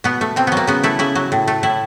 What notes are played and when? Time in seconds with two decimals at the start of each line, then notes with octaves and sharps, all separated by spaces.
0.04 B2 B3
0.21 A3
0.36 B2 C4
0.47 F#3 B3
0.57 A#3
0.67 C#3 B3
0.83 A3 E4
0.99 C#3 E4
1.15 F#3
1.32 A2
1.48 A3
1.63 A2 E4